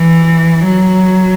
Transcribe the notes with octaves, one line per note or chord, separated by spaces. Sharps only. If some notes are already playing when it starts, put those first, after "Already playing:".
Already playing: E3
F#3